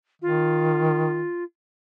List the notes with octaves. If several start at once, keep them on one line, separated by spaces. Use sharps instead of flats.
D#3 F4